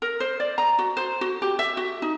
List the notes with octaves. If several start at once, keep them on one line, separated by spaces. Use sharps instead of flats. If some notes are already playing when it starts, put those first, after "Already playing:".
A#4
C5
D5
A#5
F#4
C5
F#4
G4
E5
F#4
D#4